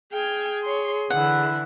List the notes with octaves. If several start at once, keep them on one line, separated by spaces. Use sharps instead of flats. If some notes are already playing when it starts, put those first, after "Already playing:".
G#4 G5 F6 G#6
C#5 C6
D3 E3 E4 F#5